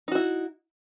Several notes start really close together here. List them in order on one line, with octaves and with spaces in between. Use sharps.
D#4 F#4 E4